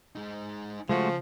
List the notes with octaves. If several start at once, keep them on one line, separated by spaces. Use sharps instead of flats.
G#3 D#4
C#3 F3 G#3 A3 F#4